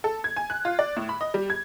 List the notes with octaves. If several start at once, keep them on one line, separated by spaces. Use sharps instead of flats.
A4
G#6
G#5
F#6
F4
D5
A2
B5
D#5
G3
G#6